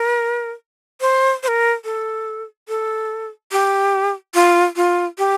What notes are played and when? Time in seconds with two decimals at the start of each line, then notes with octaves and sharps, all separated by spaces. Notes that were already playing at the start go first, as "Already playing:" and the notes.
Already playing: A#4
1.01 C5
1.43 C5
1.48 A#4
1.84 A4
2.68 A4
3.52 G4
4.34 F4
4.76 F4
5.18 G4